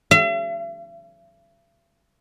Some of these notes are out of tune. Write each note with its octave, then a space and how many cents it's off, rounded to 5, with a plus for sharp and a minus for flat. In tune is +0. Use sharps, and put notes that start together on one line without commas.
E5 +45